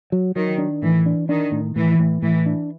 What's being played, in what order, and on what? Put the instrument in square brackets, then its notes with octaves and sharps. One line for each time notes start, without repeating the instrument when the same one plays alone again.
[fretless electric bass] F#3
[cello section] D#3 [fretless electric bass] F#3
[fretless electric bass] D4
[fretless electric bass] A2 [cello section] E3
[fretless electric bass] D4
[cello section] D#3 [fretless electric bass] D4
[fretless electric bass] A2
[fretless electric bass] A2 [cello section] E3
[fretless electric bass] A2
[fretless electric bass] A2 [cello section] E3
[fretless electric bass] D4